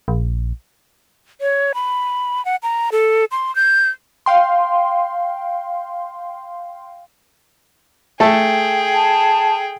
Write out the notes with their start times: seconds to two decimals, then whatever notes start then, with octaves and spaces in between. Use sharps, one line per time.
0.08 A#1
1.41 C#5
1.74 B5
2.45 F#5
2.63 A#5
2.92 A4
3.32 C6
3.56 G6
4.26 F5 G5 C6
8.20 A3 G#4 A4 G5
8.94 A5